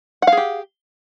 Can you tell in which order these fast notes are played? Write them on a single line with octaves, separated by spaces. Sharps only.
F#5 F5 G#4 G4